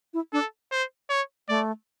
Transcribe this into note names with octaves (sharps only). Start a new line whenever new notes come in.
E4
D4 A4
C5
C#5
A3 D5